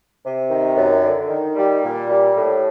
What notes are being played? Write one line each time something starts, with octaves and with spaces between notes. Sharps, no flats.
C3
D#3
F#2
D3
D#3
G3
A#2
G3
A2